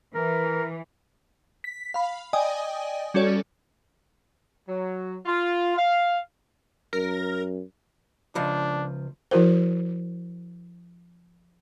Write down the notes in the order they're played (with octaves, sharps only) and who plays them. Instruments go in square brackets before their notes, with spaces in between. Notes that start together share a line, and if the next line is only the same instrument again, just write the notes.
[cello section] E3 [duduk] A#4
[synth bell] B6
F5 B5
D5 D#5 G5 G#5 D#6
G3 C#4 F#4 A4 C#5 D5
[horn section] F#3
F4
F5
[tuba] F#2 [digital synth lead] A#4
[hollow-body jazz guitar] C#2 F3 [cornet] D4
[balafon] F3 E4 F#4 A#4 C5